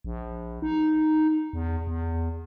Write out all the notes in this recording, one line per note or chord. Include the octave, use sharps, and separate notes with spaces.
A#1
D#4
E2
E2